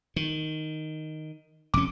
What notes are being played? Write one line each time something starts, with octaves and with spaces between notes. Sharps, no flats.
D#3
F1 C#4 D6